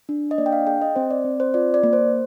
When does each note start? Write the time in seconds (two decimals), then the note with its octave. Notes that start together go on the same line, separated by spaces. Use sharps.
0.09 D4
0.31 D#5
0.38 A#3 D5
0.46 G5
0.52 F5
0.67 G#4 G5
0.81 D#5
0.96 C4 C5
1.10 D5
1.25 C4
1.40 C5
1.54 F4 D5
1.74 D5
1.83 A#3
1.93 C5